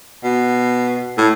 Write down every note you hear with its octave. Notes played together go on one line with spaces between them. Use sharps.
B2
A2